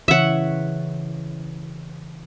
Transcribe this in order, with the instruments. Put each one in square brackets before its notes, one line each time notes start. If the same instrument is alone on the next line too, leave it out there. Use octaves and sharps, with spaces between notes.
[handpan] C#3 E3 C#5 [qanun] E5 F#5